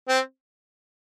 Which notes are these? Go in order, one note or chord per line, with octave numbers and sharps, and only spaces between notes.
C4